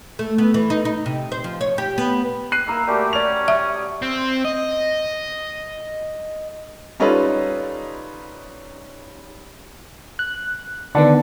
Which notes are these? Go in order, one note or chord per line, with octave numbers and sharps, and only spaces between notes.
A3
B3
E3
D#4
D#4
C3
C5
F3
C#5
G4
B3
F#6 C7 D#7
A#3 E4 A#4 E6
G3 A3 F#4 G4
C#4 D5 F7
E5 D#6
C4
D#5
G3 C#4 D#4 F4 A4 B4
F#6
D3 D#3 B3 D5 F#5 A5